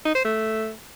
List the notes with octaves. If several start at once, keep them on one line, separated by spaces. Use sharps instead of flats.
D#4
C5
A3